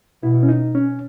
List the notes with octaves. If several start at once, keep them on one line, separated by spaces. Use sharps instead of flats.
B2 E4
C#4
D#4
C#4